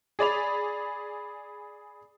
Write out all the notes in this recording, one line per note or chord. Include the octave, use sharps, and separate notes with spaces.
G#4 D5 B5 F7